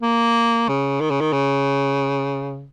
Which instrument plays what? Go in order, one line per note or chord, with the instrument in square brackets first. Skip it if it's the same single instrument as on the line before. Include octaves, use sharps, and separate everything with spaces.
[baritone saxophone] A#3
C#3
D#3
C#3
D#3
C#3